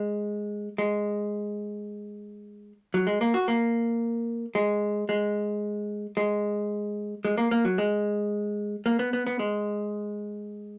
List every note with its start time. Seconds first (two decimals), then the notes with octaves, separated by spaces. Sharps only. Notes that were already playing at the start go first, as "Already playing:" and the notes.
Already playing: G#3
0.78 G#3
2.94 F#3
3.07 G#3
3.21 A#3
3.34 F#4
3.48 A#3
4.55 G#3
5.09 G#3
6.17 G#3
7.25 G#3
7.38 A#3
7.51 A#3
7.65 F#3
7.78 G#3
8.86 A#3
8.99 B3
9.13 B3
9.27 B3
9.39 G#3